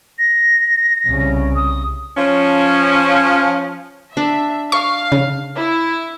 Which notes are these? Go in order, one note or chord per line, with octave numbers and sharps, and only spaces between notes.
A#6
C2 C#3
D#6
F3 C#4
D4 E5
F5 C#6
C#3
E4